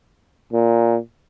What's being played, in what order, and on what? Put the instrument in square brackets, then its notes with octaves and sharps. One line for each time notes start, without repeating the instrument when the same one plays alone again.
[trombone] A#2